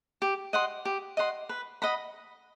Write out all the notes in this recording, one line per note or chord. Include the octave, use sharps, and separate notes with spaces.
G4
D#5 F#5 C6
G4
D#5 F#5 C6
B4
D#5 F#5 B5